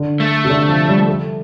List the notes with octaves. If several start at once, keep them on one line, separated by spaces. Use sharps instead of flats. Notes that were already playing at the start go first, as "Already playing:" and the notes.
Already playing: D3
A3
C3
D3
F3
G3
A3